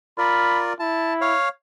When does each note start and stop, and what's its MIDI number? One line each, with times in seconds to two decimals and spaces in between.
0.18 0.73 65
0.18 0.73 70
0.18 0.73 74
0.18 0.62 83
0.80 1.35 64
0.80 1.13 81
1.21 1.49 73
1.21 1.49 77